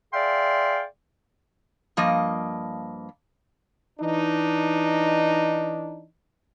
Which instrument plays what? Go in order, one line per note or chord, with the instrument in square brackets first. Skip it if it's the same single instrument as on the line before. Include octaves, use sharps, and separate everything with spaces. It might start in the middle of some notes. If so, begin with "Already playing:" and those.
[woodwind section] G#4 D5 E5 F5 G5 C6
[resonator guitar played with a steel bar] G2 F3 A#3 D#5
[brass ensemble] E3 D4 D#4